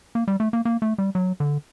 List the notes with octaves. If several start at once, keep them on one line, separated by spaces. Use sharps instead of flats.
A#3
G3
A3
A#3
A#3
A3
G3
F#3
D3